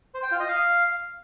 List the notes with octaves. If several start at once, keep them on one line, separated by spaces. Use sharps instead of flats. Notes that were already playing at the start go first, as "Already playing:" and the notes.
C5
G5
F4
D#5
F5